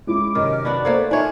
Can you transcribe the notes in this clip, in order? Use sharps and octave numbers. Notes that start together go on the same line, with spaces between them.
G#3 C#4 E4 D6
F#2 C3 D#3 C#4 D#5 F6
B3 D4 F#4 D5
A3 A#3 A4 B4 C5 G#6
D4 D#4 F4 C#5 E5 G#5